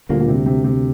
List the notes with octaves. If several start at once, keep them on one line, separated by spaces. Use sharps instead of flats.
D2 A#2 D3 G3 A#3
A#2
C3
C3
C3